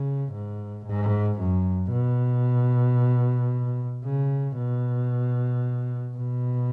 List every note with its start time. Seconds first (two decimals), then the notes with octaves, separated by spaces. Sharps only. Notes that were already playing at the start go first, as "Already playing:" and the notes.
Already playing: C#3
0.32 G#2
0.86 G#2
1.38 F#2
1.91 B2
4.04 C#3
4.57 B2
6.17 B2